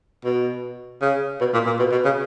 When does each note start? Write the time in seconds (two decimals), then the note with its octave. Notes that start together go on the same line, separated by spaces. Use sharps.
0.25 B2
1.02 C#3
1.41 B2
1.54 A#2
1.66 A#2
1.79 B2
1.92 B2
2.05 C#3